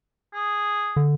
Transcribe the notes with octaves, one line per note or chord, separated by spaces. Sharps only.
G#4
D3